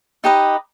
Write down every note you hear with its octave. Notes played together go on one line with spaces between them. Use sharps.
D#4 G4 B4 D#5